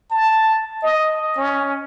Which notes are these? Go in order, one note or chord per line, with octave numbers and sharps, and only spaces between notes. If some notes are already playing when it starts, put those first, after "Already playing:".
A5
D#5
C#4